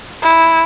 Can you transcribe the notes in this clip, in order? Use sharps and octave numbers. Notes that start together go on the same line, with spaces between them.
E4